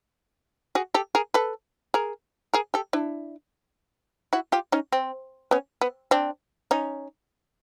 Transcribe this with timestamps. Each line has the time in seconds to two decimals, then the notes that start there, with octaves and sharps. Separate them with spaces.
0.75 F#4 G#4
0.94 G4 A4
1.15 G#4 A#4
1.34 A4 B4
1.94 G#4 A#4
2.54 G#4 A#4
2.74 G4 A4
2.93 D4 E4
4.33 E4 F#4
4.52 F4 G4
4.72 C#4 D#4
4.92 C4
5.51 B3 C#4
5.81 B3
6.11 C4 D4
6.71 C#4 D#4